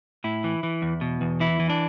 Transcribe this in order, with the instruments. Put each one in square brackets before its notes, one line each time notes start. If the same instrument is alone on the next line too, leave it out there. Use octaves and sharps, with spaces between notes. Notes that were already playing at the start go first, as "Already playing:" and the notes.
[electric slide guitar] A2 E4
E3
E3
E2
B2
E2
E3 E4
E3
D4